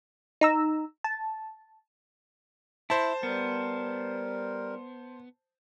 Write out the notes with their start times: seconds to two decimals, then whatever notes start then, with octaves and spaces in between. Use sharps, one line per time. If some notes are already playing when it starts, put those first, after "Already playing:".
0.41 D#4 A#5 E6
1.04 A5
2.90 E4 C5 A5
3.23 G3 B3 A#4